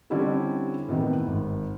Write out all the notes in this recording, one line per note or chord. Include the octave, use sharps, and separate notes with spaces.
D3 G3 C4 C#4 E4 G4
A2 C3 D#3 E3 B3
G#1